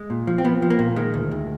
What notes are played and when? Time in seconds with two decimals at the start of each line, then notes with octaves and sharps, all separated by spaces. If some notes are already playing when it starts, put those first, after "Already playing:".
Already playing: G#3
0.10 A#2
0.27 F3
0.38 C4
0.44 F3 B3
0.62 F3
0.70 A#3
0.79 A#2
0.96 D#3 G#3
1.14 D2
1.31 D2